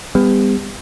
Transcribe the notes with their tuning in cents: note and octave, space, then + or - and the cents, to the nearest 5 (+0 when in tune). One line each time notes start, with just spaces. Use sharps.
G3 +35 B3 +25